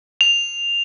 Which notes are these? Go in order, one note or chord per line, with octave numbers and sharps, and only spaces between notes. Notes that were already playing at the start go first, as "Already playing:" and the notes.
F7